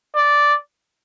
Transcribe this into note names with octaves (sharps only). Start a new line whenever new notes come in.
D5